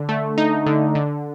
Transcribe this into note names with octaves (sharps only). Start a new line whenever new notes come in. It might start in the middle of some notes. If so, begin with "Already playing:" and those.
Already playing: D3
A3
D#4
D3
D3